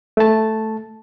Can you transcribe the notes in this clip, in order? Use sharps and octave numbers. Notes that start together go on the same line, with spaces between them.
A3 A5